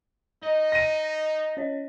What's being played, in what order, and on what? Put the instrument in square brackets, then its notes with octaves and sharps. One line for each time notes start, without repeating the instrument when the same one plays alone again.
[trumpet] D#4 [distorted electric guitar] D#5
[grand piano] A#6 D#7
[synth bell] C#4 C#5 D#5